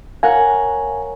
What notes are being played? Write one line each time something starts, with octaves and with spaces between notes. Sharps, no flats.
A#4 C#5 F5 F#5 G#5